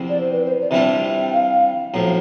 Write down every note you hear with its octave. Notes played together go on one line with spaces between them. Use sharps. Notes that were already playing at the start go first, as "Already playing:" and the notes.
Already playing: E2 C3 F3 C4 E4
D5
C5
B4
C5
D5
C3 E3 G3 D4 F4 E5
G5
F5
B1 A2 F3